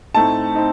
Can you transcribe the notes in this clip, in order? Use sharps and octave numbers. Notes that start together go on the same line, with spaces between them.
A2 A3 C4 D#4 A5
C4 D#4